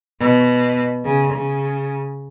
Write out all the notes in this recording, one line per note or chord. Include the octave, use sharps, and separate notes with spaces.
B2
C#3
C#3